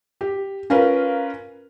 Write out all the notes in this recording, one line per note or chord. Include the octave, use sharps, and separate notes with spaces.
G4
C#4 F4 A#4 B4